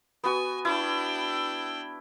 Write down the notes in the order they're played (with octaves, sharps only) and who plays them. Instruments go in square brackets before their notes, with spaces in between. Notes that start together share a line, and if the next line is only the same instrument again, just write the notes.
[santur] B3 F#4 [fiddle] G#5
[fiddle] D4 G5 [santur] E4